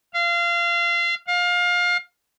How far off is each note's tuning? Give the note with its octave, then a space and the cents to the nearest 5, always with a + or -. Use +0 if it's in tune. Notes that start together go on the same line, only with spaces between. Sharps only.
F5 -25
F5 +25